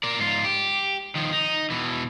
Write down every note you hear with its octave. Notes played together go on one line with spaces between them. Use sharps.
A#4 D5
G#2 F4
G4
D#3 F3
D#4
B2 E3